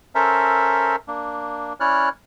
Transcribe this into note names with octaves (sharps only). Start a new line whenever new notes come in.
C#4 A4 A#4 C5 E5 A#5
A#3 D4
C#4 E4 C#5 D5 F6 F#6